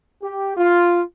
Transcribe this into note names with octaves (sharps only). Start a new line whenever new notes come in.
G4
F4